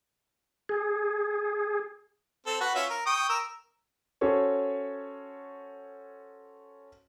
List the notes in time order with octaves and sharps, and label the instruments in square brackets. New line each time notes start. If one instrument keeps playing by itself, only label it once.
[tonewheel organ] G#4
[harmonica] C4 A4
F#4 B4
C#4 F4 E5
A#4
G5 C#6 D#6
A#4 E6
[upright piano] C#4 F#4 A4 C5 C#5